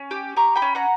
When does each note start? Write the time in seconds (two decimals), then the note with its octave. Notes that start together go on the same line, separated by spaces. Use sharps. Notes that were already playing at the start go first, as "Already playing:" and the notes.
Already playing: C#4
0.11 G4
0.37 G4 A#5 C#6
0.56 G5 B5
0.62 C#4
0.75 F#5 A#5